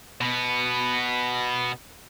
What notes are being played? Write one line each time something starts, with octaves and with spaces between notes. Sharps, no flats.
B2 B3